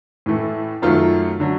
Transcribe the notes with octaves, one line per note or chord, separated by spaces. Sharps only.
A2 E3 A3
F#2 D#3 F#3 A3 F4
D3 F#3